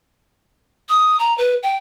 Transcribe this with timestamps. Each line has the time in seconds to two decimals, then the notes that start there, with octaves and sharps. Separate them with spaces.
0.89 D#6
1.19 A#5
1.38 B4
1.63 G5